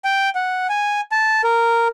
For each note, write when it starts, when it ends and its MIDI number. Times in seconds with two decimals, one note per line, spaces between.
0.05 0.30 79
0.35 0.67 78
0.69 1.01 80
1.12 1.42 81
1.44 1.88 70